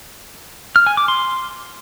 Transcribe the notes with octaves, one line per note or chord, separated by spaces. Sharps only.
F6
G#5
D6
C6